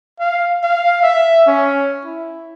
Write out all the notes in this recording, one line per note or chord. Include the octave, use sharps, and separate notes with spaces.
F5
F5
E5
C#4
E4